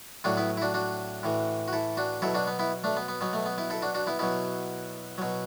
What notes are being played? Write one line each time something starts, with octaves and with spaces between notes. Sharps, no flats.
A2 F#3 D4 F#4
B3 E4
E4
D4 F#4
D4 F#4
A2 E3
F#4
E4 A4
D4 F#4
B2 F#3 E4 A4
D4 F#4
B3
B3 E4
A3 D4
B3
B3
B2 F#3 B3
A3
B3
B3 E4
E4 A4
D4 F#4
D4 F#4
B3 E4
B2 F#3 B3 E4
B2 F#3